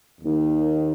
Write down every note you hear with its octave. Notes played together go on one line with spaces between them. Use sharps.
D#2 D#3